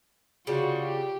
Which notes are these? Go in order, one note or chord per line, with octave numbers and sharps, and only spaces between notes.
C#3 G3 F4 F#4
G4